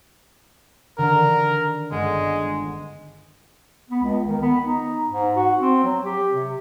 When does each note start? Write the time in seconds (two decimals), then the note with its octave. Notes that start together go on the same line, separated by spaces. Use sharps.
0.98 D3 D#3 A#4
1.92 G1 G#3
3.90 B3
4.03 C#2
4.28 D#3
4.42 B3
4.64 D#4
5.10 G#2
5.37 F#4
5.59 C4
5.84 F#3
6.05 G4
6.33 C3